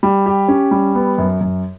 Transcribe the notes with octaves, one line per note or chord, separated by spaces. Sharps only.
G3
G4
C#4
G3
B3
F#2
F#2